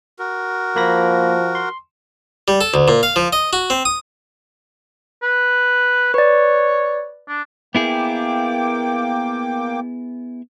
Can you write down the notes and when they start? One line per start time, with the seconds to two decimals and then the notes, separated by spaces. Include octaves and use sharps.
0.19 F#4 A#4
0.76 F3 A#3 B5 A#6
1.55 C6
2.48 G3
2.61 A4
2.74 D2
2.88 A#2
3.03 F5
3.16 F3
3.33 D#5
3.53 F#4
3.70 C4
3.85 D#6
5.22 B4
6.14 B4 C#5 D5
7.28 D4
7.75 A#3 B3 E4 G#4 G5 D6